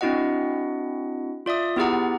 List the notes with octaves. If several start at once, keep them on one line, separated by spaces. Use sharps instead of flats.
C4 D4 E4 F#4 D#5 F#5
F4 D5 E5 D#6
B3 E4 G4 G#4 F#5 A#5